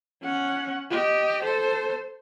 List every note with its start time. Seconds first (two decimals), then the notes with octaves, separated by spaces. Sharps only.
0.23 C#4 F#5
0.90 G4 D#5
1.43 A4 C5